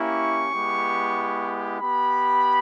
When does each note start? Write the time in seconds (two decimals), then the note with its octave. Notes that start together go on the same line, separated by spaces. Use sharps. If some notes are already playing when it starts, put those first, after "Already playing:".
Already playing: A#3 C#4 E4 G4 C#6
0.52 G#3 B3 E4 G4
1.80 B3 G4 B5